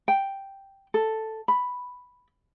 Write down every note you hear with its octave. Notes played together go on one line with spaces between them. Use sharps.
G5
A4
B5